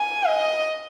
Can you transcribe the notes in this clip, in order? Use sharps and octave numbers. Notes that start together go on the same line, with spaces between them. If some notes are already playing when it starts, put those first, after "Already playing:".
Already playing: G#5
D#5